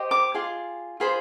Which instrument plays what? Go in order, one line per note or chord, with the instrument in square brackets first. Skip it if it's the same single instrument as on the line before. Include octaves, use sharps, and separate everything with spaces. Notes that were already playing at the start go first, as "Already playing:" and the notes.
Already playing: [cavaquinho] G4 C5 D#5
D6
F4 G#4
F4 G#4 C5 B5